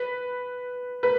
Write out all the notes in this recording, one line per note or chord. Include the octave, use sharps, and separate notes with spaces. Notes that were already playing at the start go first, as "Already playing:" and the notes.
Already playing: B4
B4